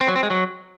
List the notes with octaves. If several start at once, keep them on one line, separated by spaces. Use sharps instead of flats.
C4
F#3
C4
G#3
F#3